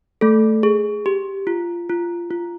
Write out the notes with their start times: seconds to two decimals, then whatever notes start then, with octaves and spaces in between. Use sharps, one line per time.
0.21 A3 A4
0.63 G#4
1.06 G4
1.47 F4
1.89 F4
2.31 F4